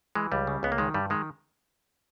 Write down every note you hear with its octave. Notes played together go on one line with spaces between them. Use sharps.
E3 G#3
C#2 G3
C#3
C#2 B3
A#3
D#3 G#3
G2 G3
D#3 G#3